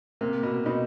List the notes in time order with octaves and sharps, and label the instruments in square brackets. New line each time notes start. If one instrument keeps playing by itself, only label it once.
[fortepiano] C3 [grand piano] A#3
[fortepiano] B2
[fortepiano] B2 [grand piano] D#4